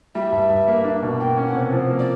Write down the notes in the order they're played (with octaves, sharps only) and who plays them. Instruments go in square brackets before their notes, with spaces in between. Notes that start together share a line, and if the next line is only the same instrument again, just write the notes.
[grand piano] G3 [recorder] E5
[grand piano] G2
G2
A#3
D4
B2
[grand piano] A#3 [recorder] G5
[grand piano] C#4
[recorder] F#5
[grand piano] C3
F3
A#3
[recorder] D5